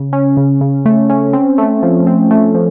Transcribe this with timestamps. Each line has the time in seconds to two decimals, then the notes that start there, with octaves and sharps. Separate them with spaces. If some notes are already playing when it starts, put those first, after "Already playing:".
Already playing: C#3
0.13 C#4
0.37 C#3
0.61 C#3
0.86 A3
1.10 C#4
1.33 C4
1.58 A3
1.83 F3
2.07 C4
2.31 A3
2.55 F3